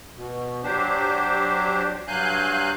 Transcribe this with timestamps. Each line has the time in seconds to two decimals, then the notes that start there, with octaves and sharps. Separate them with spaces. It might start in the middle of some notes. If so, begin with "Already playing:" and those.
0.16 B2
0.64 F#3 D4 G4 C5
2.08 G2 F#3 F5 G#5 F#6 G6